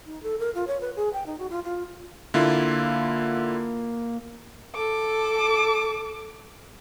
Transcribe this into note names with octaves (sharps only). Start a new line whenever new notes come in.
D#4
A4
A#4
F4
C#5
B4
G#4
G5
D#4
F#4
F4
F4
D3 A#3 E4 F4
A4 D6